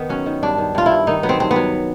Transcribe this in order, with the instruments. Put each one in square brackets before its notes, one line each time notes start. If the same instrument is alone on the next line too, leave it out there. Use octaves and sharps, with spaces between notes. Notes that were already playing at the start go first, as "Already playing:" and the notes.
Already playing: [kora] D#3 B3
F#3 C#4
D#3
G2 D4
D#3
G2 F4
E4
G2
D#3 D#4
F#3 B3
C4
G2 C4
B3
F#3